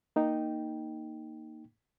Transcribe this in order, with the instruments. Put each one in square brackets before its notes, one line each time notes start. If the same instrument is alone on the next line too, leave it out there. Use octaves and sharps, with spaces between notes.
[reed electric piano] A#3 D#4 G5